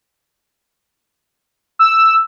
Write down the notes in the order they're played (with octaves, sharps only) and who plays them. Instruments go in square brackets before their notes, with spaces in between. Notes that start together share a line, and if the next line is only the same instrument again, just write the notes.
[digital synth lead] E6